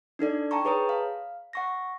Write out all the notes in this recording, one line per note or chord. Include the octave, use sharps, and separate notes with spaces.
D4 D#4 A4 D5
G5 A5 A#5 C#6
G#4 B4 C#5 A#5 D#6
F5
F#5 C#6 A#6